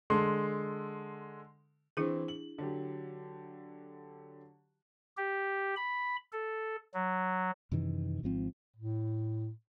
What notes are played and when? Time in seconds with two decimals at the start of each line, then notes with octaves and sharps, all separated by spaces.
0.10 D3 G#3 A4 C6
1.97 E3 C4 D4 E4 G#4
2.28 F#7
2.58 D3 F#3 G4
5.17 G4
5.76 B5
6.32 A4
6.94 F#3
7.72 F#2 C3 D#3 E3
8.23 G#1 G#2 F3 C4
8.77 A2